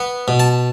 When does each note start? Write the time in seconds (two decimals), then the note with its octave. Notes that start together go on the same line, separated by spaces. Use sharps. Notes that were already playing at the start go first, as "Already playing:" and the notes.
Already playing: B3
0.28 B2
0.39 A5